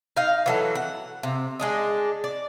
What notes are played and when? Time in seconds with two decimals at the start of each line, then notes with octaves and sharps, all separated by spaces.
0.16 D#4 F5
0.46 E3 F#3 A4
0.75 F#5
1.23 C3
1.60 G#3 D4 D#4
2.24 D5